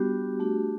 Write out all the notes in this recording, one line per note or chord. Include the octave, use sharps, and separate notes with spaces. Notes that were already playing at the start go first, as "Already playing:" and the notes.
Already playing: G3 B3 D4 F#4 G4
A3 D4 F#4